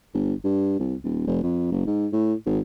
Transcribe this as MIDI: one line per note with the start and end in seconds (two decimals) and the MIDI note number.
0.14 0.34 31
0.44 0.78 43
0.79 0.95 36
1.04 1.24 27
1.27 1.39 29
1.43 1.69 41
1.72 1.83 30
1.87 2.07 44
2.13 2.34 45
2.46 2.60 32